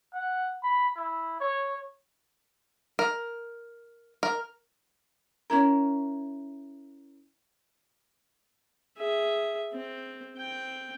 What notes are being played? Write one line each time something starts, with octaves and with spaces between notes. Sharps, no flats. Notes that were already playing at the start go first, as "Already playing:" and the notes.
F#5
B5
E4
C#5
A#4
A#4
C#4 D#4 E4 A#4
G#4 E5
C4
C4 G5